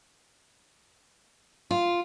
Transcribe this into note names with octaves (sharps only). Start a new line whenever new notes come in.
F4